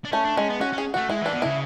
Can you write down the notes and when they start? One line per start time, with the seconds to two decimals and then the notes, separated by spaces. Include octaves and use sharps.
0.05 D4
0.12 A3 C#4
0.25 D4
0.37 G#3 C#4
0.49 B3
0.61 C#4 F#4
0.73 C#4
0.78 G#4
0.94 A3 F#4
1.10 G#3 E4
1.22 E3 D4
1.34 B2
1.42 C#3 E4